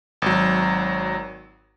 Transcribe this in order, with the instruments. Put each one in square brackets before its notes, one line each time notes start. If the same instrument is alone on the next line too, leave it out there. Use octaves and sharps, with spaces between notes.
[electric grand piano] G#1 F#3